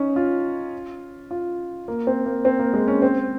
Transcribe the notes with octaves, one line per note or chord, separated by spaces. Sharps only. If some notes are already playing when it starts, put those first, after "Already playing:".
Already playing: C#4 D#4
F4
F4
A#3
C4
A#3
C4
A#3
G#3
C#4
C4